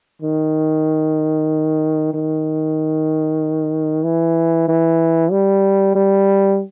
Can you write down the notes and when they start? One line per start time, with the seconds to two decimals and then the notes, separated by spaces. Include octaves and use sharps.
0.22 D#3
2.14 D#3
4.05 E3
4.68 E3
5.31 G3
5.95 G3